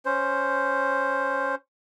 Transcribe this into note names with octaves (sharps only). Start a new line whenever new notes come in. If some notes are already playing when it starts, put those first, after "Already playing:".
C#4 C5